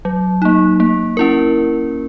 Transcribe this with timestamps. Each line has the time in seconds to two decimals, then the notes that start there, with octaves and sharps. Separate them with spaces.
0.05 F#3
0.42 A#3 D#4
0.80 A#3
1.17 C#4 E4 A#4